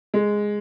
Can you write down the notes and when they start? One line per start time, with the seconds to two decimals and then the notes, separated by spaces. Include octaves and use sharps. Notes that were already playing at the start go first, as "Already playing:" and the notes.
0.14 G#3